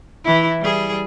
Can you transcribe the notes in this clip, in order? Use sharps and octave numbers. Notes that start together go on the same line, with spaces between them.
E3 E4
G3 G#4